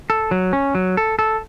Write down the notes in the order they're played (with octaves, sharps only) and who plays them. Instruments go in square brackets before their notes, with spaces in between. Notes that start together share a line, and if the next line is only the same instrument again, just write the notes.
[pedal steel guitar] A4
F#3
C#4
F#3
A4
A4